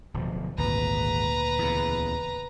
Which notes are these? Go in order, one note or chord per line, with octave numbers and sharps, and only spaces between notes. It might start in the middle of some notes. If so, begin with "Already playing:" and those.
D1 B2 F3
G#1 D2 A#2 B4 A#5
E2 C#3